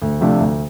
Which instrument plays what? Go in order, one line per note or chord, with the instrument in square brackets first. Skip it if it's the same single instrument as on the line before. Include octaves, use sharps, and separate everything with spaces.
[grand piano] D2
C3 F3 A3 D4
D2